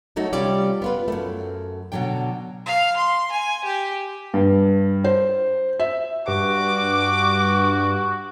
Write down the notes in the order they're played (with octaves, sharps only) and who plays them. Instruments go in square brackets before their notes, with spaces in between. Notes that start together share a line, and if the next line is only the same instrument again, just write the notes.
[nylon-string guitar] F#3 A3 D#4 F#4
C3 G3 C#4 F4 G4 D5
B3 F4 B4
F#2 A3
B2 D3 F#3 D4 G5
[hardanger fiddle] F5
C6
G#5
G4
[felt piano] G2
C5
E5
[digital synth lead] G2 [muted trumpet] F#4 [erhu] D6